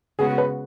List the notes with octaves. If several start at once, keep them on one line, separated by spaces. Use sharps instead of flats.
C#3 G#3 B3 F#4 G#4
B4